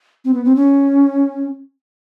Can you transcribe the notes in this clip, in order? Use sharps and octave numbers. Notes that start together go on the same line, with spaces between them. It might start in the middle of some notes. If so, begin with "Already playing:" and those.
C4
B3
C4
C#4